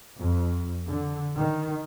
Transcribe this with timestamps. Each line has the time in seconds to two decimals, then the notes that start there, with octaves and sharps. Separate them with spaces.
0.19 F2
0.87 D3
1.38 D#3